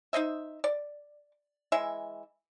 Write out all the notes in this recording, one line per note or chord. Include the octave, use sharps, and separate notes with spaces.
D#4 C5 D#5 E5
D5
E3 G#3 E5